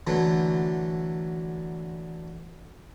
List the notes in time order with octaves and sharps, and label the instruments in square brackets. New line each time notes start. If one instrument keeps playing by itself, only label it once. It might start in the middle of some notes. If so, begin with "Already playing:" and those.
[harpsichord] D3 E3 F#3 A3